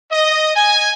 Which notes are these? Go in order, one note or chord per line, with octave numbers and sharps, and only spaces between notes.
D#5
G#5